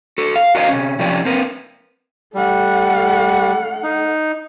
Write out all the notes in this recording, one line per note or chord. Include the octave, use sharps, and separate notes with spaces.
F#4 A4
F5
F#4 A#4 C5 D5 D#5 F5
C3 C#4
C3 F3 C#4 G4 D5
C4 A#4 B4
G3 A3 F#5
D#4